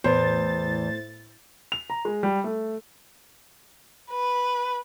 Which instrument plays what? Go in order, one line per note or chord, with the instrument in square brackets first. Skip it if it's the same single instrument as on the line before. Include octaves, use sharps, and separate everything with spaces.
[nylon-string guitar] E2 [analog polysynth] A2 A6 [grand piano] C5
[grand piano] F7
A#5
G#3
G3
A3
[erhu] B4